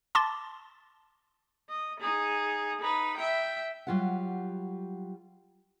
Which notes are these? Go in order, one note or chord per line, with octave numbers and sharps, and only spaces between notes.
A5 C6 D6 A6
D#5
D#4 G#4
D#4 B4
E5 G5
F#3 G3 F4 G4 F#5